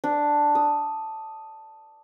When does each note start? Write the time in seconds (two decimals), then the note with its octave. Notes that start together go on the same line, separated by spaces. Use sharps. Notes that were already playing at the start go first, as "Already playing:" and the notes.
0.04 D4
0.55 D#6